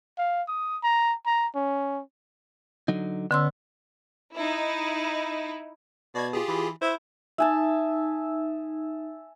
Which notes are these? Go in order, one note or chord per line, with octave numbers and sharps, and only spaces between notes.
F5
D#6
A#5
A#5
C#4
D3 F#3 D#4
D3 B3 C#4 C6 E6
D#4 E4
B2 D5 G#6
F4 G4 G#4
E3
E4 C5
D#4 E5 G#5 A5